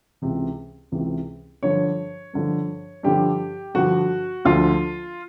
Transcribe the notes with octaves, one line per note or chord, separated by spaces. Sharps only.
C#2 C3 E3
C#2 C3 E3
G2 D3 F3 C#5
G2 D3 F3
G2 D3 F3 G4
G2 D3 F3 F#4
D2 D3 F3 F4